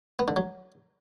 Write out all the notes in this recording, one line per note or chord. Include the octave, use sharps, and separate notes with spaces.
B3
D3
F#3